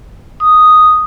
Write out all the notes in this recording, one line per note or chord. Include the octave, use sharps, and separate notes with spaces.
D#6